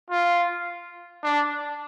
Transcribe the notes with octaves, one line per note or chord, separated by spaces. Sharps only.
F4
D4